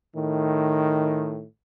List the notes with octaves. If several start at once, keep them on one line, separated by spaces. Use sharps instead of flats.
A2 D#3